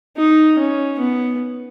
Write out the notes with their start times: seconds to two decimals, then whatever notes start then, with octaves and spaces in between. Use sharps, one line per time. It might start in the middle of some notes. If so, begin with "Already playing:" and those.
0.17 D#4
0.59 C#4
1.00 B3